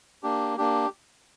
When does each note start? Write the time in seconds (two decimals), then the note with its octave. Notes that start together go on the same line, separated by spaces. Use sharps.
0.23 A#3 D4 G4
0.57 A#3 D4 G4